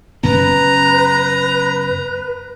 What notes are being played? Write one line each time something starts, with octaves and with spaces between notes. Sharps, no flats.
F#2 C#3 B3 B4 A#5